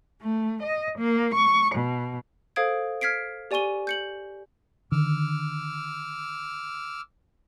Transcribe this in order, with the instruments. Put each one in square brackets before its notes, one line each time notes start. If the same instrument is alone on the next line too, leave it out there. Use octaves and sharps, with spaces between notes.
[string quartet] A3
D#5
A#3
C#6
B2
[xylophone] A4 C5 F5 D#6 G#6 D7
F6 G#6 B6 C7 D7
G4 D5 G#5 C#6 D#7 G7
G6 C#7 F#7
[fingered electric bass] D3 D#3 D4 [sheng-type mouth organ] D6 E6 F6